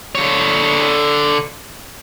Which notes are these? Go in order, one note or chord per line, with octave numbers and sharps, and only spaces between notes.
D3 C#5